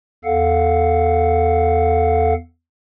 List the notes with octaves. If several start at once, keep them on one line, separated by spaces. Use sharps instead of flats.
E2 A4 F5 F#5